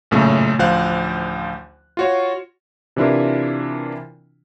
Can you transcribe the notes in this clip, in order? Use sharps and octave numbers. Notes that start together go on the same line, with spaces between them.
A1 F#2 A#2 C#3 A3
A1 D2 F3 C5 F5 F#6
F4 F#4 C#5
C3 E3 D4 E4 F4 A#4